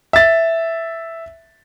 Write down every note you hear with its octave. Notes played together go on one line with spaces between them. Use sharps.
E5 A6